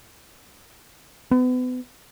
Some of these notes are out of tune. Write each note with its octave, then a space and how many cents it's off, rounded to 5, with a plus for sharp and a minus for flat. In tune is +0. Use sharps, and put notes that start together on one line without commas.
B3 +35